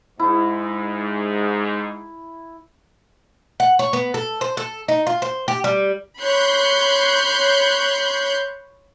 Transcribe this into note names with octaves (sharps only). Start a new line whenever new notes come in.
G#2 E4
F#5
C#5
B3
A4
C5
A4
D#4
F4
C5
G4
G3
C#5 B5 C6 F#6 G6